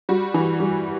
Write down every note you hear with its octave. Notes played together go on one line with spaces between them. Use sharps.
G3 F#4
E3
G3